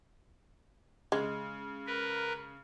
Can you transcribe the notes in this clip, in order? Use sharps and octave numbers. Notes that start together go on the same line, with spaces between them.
C#3 G#3
A#4 B4